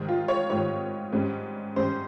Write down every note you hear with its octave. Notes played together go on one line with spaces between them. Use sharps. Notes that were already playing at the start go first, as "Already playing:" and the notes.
Already playing: G#2 D#3 G3
F4
C#5
G#2 D#3 G3 C#5
G#2 G3 C#4
G#2 G3 C#4 C5